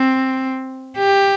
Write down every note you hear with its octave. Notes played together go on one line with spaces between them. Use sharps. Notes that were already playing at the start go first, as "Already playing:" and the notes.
Already playing: C4
G4